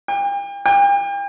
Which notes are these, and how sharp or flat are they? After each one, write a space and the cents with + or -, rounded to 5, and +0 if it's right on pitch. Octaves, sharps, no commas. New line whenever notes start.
G5 +40
G5 +40